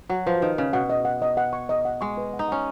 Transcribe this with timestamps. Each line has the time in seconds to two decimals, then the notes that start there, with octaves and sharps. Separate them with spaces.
0.09 F#3 F#5
0.26 F3 B4
0.41 D#3 B4
0.58 C#3 B4
0.73 B2 F#5
0.90 D#5
1.05 F#5
1.22 D#5
1.37 F#5
1.53 C#6
1.69 D#5
1.85 F#5
2.01 G#3 C#6
2.17 B4
2.33 F#5
2.39 D#4
2.49 C#4 F#5